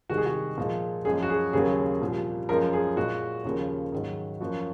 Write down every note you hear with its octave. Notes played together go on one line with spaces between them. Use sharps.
C2 C3 D#3 G#3 F#4
G#4
F#4
A#2 F3 G#3
F#2 F3 G#3 G#4
F#4
G#4
D#2 C#3 F#3 A#3 G#4
C2 A#2 F3
F#2 F3 G#3 A#4
G#4
A#2 G#3 F#4
D#2 C#3 F3 A#3
G#2 D#3 F#3
F#2 F3 A#3 F#4